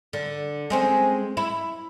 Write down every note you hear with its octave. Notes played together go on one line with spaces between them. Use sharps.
D3
G#3 C4 C#4
E4